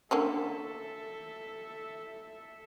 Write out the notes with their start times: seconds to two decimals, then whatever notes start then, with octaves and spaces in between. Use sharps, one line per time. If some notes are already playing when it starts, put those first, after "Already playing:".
0.11 D3 A#3 C#4 A4 E5